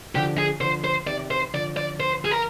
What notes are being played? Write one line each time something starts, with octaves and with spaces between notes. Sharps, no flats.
D3 F3 G4
G#4
D3 F3 C5
C5
C3 D#3 D5
C5
D3 F3 D5
D5
C5
G#4
A#4